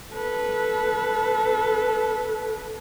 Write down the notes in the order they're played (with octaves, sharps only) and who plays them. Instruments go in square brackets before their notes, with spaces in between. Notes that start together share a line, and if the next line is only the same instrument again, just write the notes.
[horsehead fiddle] A4 B4